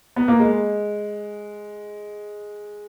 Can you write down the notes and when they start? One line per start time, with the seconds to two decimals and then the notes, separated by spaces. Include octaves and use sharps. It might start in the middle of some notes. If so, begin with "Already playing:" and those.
0.16 B3
0.28 A#3
0.40 G#3